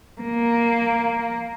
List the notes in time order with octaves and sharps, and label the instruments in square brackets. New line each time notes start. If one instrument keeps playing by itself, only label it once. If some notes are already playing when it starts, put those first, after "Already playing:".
[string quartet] A#3